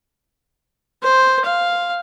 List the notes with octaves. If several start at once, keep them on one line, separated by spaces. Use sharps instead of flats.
C5
F5